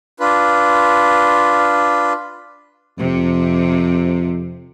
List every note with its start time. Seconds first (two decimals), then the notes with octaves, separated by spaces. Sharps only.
0.20 D4 F4 B4
2.98 F2 C3